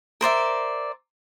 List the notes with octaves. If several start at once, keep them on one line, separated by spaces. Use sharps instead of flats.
A#4 C5 D5 E5